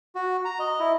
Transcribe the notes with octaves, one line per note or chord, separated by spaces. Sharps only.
F#4
A#5
D#5
E4